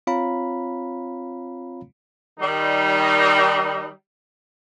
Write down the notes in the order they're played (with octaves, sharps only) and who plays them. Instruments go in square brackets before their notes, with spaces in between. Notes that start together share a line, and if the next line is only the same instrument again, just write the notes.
[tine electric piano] C4 F4 C#5 F5 A#5 B5
[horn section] D#3 G3 D#4